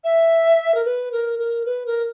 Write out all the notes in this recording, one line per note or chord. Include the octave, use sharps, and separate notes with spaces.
E5
A#4
B4
A#4
A#4
B4
A#4